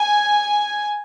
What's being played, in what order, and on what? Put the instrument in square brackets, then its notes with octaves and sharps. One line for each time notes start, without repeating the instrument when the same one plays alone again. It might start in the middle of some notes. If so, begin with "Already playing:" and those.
Already playing: [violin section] G#5